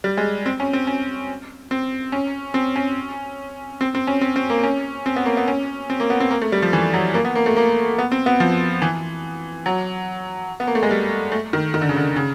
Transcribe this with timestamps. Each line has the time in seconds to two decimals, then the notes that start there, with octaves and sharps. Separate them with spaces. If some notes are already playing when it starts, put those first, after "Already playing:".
0.04 G3
0.17 G#3
0.46 C4
0.60 C#4
0.73 C4
0.87 C#4
1.71 C4
2.12 C#4
2.54 C4
2.76 C#4
3.81 C4
3.95 C4
4.07 C#4
4.21 C4
4.36 C4
4.50 A#3
4.63 C#4
5.06 C4
5.16 B3
5.26 A#3
5.37 B3
5.48 C#4
5.90 C4
6.00 A#3
6.10 B3
6.20 C4
6.31 A#3
6.42 A3
6.52 G3
6.62 F3
6.73 E3
6.93 F#3
7.14 A#3
7.25 B3
7.36 A#3
7.46 A3
7.57 A#3
7.98 B3
8.12 C4
8.26 B3
8.40 F3
8.82 E3
9.66 F#3
10.60 B3
10.67 A#3
10.75 A3
10.83 G#3
10.91 G3
11.32 A3
11.53 D#3
11.74 D#3
11.81 D3
11.89 C#3
11.96 D3
12.16 C#3